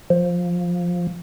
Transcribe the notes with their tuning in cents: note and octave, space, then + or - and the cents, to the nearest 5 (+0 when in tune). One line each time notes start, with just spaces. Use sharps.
F3 +10